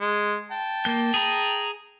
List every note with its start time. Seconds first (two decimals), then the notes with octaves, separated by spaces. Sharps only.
0.01 G#3
0.51 G5 A5
0.85 A#3 G6
1.14 G#4 A#5